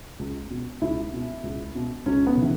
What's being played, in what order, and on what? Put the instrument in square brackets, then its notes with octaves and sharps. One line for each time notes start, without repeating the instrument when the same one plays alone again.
[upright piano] C#2
B2
C#2 E4
B2
C#2
B2
C#2 C#4
B3
C#3 E3